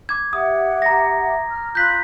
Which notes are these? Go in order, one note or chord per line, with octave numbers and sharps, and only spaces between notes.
D6 G#6
G4 E5 F#5 D#6
A#5 A#6
F6
F4 B5 F#6 G6 B6